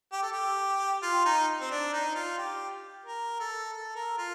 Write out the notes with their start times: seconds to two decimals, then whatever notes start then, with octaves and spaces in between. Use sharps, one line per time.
0.12 G4
0.22 A4
0.32 G4
1.02 F4
1.25 D#4
1.61 C4
1.70 D4
1.93 D#4
2.15 F4
2.38 G4
3.06 A#4
3.40 A4
3.72 A4
3.95 A#4
4.18 F4